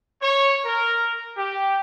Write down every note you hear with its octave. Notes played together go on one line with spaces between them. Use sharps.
C#5
A#4
G4